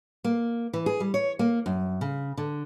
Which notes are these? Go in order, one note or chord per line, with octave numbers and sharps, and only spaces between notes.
A#3
E3
G#4
G3
C#5
A#3
F#2
C#3
D3